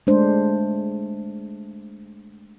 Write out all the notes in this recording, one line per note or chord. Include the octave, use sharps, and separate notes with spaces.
G#3 A3 D4 C5